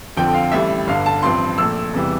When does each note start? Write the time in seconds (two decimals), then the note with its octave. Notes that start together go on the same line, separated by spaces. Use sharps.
0.16 F2 D3 F3 C4 G5
0.34 F5
0.52 A1 A2 G3 E5
0.87 G1 G2 D3 F5
1.06 A5
1.22 A1 G2 F3 C4 C6
1.58 A#1 A#2 A3 E6
1.93 E1 E2 C3 E3 G3